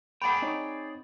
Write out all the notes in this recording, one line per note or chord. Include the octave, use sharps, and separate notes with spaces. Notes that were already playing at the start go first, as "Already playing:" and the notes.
G#4 D5 F#5 G5 B5
C4 D#4 C#5